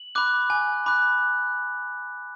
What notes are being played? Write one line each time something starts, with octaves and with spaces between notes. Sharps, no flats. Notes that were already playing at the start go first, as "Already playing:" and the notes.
Already playing: F#7
B5 D6 F#6
G#5
B5 D6 F#6